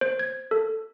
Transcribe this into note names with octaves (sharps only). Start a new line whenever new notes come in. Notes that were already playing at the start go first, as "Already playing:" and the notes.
C5
G#6
A4